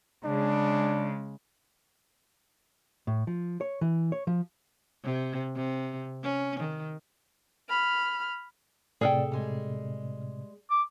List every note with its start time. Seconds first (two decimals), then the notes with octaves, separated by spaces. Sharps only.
0.25 C#3 G#3 D4
3.07 A2
3.27 F3
3.61 C#5
3.81 E3
4.12 C#5
4.27 F3
5.04 C3
5.56 C3
6.23 C#4
6.60 D#3
7.69 B5 F6
9.01 A2 C3 G#4 A4 D5 G5
9.32 G3 G#3
10.71 D6